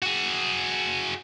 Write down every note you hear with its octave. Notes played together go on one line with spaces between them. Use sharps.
F#4 G#4